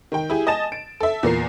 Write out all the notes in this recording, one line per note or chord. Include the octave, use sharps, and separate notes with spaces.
D#3 G5
E4 G4 G#4
D#5 G#5 A5 A6 E7
D7
A4 E5
E2 A#2 A#4 C7